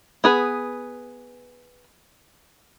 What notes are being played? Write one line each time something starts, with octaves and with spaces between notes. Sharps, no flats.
B3 G#4 B4